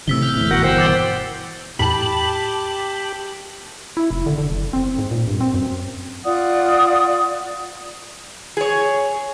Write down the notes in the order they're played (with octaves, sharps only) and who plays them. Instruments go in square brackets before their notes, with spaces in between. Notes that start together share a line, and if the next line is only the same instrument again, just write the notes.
[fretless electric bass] A2 C3 D#3 [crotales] E6 B6 G7
[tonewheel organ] F6 G6
[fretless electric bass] E2 A2
[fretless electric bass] G1 B2 E3 [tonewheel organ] F#4 A#4 F#5 [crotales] G6
[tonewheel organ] C5 F#5 G5
[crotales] D6 E6 A6
[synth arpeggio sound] E2 A2 [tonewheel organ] G4 [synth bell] A5 F#7 [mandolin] B5
[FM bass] E4
F1
D3
D3
F#1
C4
G#2
A#2
G2
C4
F#2
[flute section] F4 D5 F#5 D#6
[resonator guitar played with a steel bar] G#4 C#5